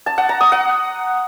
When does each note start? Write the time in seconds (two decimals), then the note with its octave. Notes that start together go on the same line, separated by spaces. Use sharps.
0.06 A5
0.18 F#5
0.29 A#5
0.41 D#6
0.52 F#5